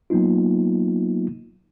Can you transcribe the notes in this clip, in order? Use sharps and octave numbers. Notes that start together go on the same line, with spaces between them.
F#3 A#3 B3 D#4 F4